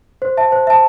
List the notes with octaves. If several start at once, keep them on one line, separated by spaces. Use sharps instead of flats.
C5
E5 A5
C5
E5 A5